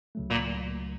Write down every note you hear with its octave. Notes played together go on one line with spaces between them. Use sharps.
C#2 C#3 F#3 A3
A#2